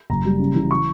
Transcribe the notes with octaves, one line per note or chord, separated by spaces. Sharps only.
F#1 A#5
G3
C#3
E3
C#6